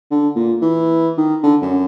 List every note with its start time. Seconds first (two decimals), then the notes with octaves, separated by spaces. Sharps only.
0.11 D3
0.35 A#2
0.62 E3
1.17 D#3
1.43 D3
1.62 F#2